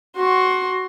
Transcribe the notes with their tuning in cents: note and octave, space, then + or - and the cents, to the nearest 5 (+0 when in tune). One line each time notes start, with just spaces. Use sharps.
F#4 +5 C6 +20